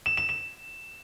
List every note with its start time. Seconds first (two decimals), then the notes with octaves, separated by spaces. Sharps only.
0.06 E7
0.17 E7
0.29 E7